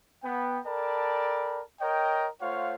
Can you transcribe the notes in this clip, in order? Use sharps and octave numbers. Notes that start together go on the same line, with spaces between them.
B3 G5
A4 A#4 D5 G5 A5 B5
A#4 C#5 D#5 G5
A3 F4 C5 C#5 F5 F#5